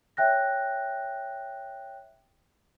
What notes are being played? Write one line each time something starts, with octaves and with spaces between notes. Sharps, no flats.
C#5 E5 G5 F#6 A#6